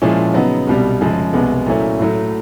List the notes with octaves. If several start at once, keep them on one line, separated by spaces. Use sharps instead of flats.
A#2 F3 G#3 C#4 E4
C#3 F#3 B3 D#4
C2 B2 G3
F#2 C#3 F3 G#3
C2 B2 G#3 B3
A#2 F#3 A3 C#4 E4
A2 F#3 A3